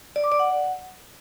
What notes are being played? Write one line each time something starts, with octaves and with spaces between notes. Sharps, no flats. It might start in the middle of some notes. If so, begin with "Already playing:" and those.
D5
D6
D5
F#5